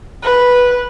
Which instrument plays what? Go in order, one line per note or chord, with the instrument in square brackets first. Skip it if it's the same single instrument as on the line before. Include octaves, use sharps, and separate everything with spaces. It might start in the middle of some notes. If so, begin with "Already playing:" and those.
[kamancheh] B4